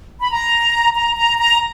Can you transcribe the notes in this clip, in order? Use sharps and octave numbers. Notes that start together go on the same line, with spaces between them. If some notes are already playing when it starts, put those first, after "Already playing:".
B5
A#5
A#5
A#5
A#5